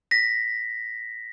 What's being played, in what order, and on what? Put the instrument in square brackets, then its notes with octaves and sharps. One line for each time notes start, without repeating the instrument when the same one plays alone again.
[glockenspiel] A#6 B6